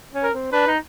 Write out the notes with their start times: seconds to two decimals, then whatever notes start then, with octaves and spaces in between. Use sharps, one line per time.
0.14 C#4
0.23 A#4
0.34 C4
0.52 D4 B4
0.67 D#4